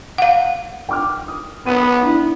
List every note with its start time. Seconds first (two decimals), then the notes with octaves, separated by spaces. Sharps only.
0.18 F5 F#5
0.89 G5 D6 F6
1.28 D#6
1.66 B3 D#6 D#7
2.02 D4 E4